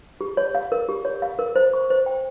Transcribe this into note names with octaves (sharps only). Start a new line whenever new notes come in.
G4
C#5
F5
A#4
G4
C#5
F5
A#4
C5
C#6
C5
G5